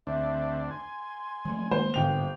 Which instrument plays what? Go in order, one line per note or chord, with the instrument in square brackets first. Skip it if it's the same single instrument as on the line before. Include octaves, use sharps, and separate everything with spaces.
[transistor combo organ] D2 C4 D4 [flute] E5
[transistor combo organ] G#5 [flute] C6
[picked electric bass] F3 F#3 A3
[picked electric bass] D#3 G#3 A#3 [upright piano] C5
[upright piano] G1 G5 F7 [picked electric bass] G#2 D3 [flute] C5